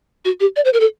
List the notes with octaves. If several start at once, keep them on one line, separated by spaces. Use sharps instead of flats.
F#4
G4
D5
C5
A#4
A4